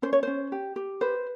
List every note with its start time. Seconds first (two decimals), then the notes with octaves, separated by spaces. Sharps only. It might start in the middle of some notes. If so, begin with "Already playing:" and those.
0.02 C#4 C5
0.13 C#5
0.23 C#4 C5
0.52 G4
0.76 G4
1.01 B4 C5